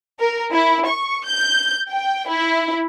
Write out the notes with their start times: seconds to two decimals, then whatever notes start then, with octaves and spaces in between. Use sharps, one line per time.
0.20 A#4
0.53 E4
0.87 C#6
1.26 G6
1.89 G5
2.28 E4